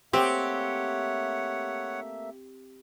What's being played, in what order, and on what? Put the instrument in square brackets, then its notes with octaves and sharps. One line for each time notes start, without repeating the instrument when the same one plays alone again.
[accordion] A3 A#3 E5 [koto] C4 [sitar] G4 [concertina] C#5 F#5